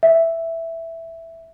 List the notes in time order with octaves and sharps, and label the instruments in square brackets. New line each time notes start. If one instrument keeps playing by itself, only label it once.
[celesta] E5